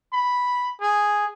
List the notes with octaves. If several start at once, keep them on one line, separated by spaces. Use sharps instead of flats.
B5
G#4